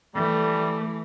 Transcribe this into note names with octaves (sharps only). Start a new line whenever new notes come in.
E3 G3 A3